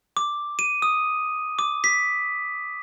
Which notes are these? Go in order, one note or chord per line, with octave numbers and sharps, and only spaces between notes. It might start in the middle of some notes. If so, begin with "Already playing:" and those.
D6
D#7
D#6
D6
B6